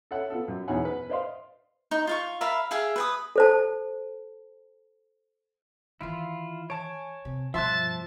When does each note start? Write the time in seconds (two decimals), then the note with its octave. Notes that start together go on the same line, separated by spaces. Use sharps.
0.11 A4 C#5 E5 F#5
0.30 B3 F4 A4
0.48 F#2
0.68 E2 B2 D#4 C#5 F#5 G#5
0.85 B4
1.09 B4 C5 D5 D#5 F5 C6
1.91 D#4
2.07 F4 F5 C#6
2.41 A#4 E5 F5 B5
2.71 G4 G#4 E5 F5
2.96 B4 G#5 D#6
3.36 A4 C5 A5
6.01 D#3 E3 E4 F4
6.70 C#5 G#5 A5 D7
7.25 C3
7.54 G2 B2 F3 E5 A5 C6 F#6